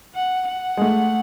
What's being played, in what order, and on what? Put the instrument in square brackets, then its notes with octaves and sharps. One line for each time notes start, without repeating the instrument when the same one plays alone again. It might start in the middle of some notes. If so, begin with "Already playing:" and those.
[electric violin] F#5
F#5
[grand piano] G#3
A3